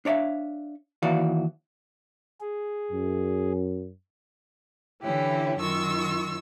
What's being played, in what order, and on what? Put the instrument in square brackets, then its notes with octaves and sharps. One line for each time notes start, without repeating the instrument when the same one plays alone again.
[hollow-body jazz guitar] D4 C#5 D5 E5 F5
D#2 E3 F#4 D5 F5
[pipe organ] G#4
[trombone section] F#2
[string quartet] D3 E3 C#4 E4 G4
F#2 D#3 F4 C#6 E6